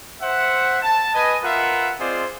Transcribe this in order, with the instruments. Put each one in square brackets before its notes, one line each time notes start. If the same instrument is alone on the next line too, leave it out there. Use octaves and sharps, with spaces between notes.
[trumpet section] C5 E5 F#5
A5
B4 D#5 G#5
F4 A#4 B4 E5 F#5
C4 F4 G#4 C5 D5 D#5